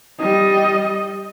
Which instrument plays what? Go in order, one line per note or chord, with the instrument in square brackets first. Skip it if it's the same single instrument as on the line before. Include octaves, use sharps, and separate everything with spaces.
[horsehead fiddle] G3 D#5